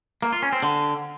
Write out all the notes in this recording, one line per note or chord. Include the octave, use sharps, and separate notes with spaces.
A#3
F4
C#4
C4
D3